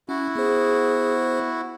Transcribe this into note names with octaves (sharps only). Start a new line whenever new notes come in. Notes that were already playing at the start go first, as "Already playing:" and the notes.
C#4 E4 F#4
B3 G#4 C5